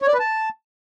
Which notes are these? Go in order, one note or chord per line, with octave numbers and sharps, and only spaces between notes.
C#5
D5
B4
A5